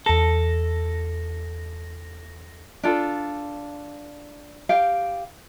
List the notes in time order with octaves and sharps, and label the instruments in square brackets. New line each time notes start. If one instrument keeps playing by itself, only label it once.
[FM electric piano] E2 A#6 [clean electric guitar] A4
[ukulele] D4 F4 A4
G4 F5 G5